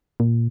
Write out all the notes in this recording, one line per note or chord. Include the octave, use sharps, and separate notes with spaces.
A#2